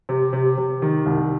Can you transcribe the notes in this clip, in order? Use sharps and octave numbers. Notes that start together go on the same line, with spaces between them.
C3
C3
C3
D#3
C2